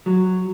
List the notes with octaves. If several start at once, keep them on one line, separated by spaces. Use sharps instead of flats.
F#3